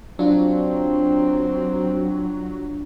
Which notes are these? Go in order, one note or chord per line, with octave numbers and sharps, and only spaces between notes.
F#3 C4 D4 F4